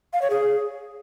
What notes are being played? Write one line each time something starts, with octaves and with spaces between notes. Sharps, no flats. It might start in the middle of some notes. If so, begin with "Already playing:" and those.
F5
C#5
G#4